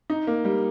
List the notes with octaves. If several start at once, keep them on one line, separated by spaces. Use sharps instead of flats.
D#4
A#3
G3